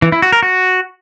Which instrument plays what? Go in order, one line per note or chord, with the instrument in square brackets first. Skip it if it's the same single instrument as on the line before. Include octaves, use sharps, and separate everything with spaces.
[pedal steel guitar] E3
E4
F#4
A#4
F#4